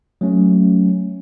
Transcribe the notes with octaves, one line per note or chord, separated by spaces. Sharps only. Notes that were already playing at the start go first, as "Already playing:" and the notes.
F#3 A3 C#4